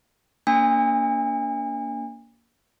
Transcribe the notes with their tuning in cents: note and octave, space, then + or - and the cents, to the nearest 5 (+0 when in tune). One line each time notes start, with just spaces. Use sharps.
A#3 +0 D4 -40 G#5 -35